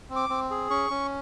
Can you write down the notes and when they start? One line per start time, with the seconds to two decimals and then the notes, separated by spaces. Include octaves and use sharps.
0.10 C4
0.16 D6
0.29 C4
0.50 G#4
0.70 C#4 C#6
0.90 C#4